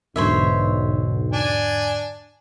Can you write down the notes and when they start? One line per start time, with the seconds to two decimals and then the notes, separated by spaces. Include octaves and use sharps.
0.16 B1 E2 G#2 D3 C5 C#5 E5
1.33 D4 G#5